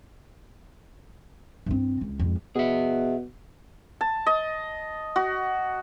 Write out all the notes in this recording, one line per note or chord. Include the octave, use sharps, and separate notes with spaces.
G2 C4
C#2
F2 G#2
B2 G#4 E5
A5
D#5
F#4